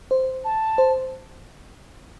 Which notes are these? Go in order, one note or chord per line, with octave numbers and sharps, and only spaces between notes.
C5
A5
C5